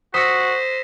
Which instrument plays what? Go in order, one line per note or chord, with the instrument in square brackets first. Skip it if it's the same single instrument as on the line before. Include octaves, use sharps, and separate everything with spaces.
[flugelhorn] F#4 [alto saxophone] C5 [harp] D#6 E6 C#7 [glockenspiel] A#6 B6